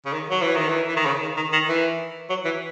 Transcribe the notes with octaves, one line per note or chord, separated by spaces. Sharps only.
C#3
D#3
F#3
E3
D#3
E3
E3
D#3
C#3
D#3
D#3
D#3
E3
F#3
E3